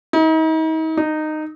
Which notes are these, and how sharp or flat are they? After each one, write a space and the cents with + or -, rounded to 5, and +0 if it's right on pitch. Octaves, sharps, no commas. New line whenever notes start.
D#4 +40
D#4 -15